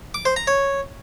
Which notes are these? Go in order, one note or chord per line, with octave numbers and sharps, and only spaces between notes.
D6
C5
A#5
C#5